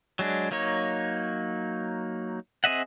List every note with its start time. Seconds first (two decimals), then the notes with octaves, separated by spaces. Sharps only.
0.19 F#3 G#3 D4
0.51 F#3 A#3 D#4 C#5
2.64 C4 G#4 D#5 E5 F#5